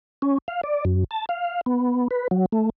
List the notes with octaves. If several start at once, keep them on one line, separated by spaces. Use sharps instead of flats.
C#4
F5
D5
F#2
A5
F5
B3
B4
F#3
A3